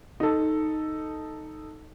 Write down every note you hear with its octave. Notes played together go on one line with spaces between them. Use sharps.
D#4 A4